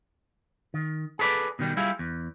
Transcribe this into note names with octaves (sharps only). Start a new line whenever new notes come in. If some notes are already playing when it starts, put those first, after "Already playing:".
D#3
G#4 A4 B4 C#5 D5
B2 D#3 G3
G3 E4 F4 G#4
E2